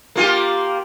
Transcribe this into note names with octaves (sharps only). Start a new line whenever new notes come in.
A#3 F4 G4